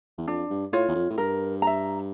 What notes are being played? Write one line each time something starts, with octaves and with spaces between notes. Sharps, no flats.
E2
F2 D4
G2
A2 F4 C#5
E2
F2
A2
G2 A#4
E5 A#5